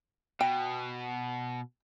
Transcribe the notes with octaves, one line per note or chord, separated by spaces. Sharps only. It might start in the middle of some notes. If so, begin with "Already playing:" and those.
B2 G5